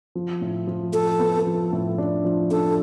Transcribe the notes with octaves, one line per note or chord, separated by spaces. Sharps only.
F3
A2
F3
F3 A4
B3
F3
A2
D4
F3
D4 A4